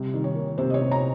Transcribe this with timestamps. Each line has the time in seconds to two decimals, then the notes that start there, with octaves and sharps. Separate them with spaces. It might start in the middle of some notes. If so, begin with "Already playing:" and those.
Already playing: C3 G3
0.14 D#3
0.24 C#5
0.35 A#3
0.58 C3 C5
0.70 D#5
0.74 C#5
0.81 C3
0.91 A#5